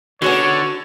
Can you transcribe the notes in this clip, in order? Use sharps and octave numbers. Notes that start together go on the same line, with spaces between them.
D3 B3 C#4 D#4 F#4 G#4 C#5